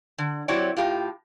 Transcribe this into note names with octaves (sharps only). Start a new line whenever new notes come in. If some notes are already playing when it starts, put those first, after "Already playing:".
D3
F#3 C4 E4 G4 C#5 D5
A2 F4 G4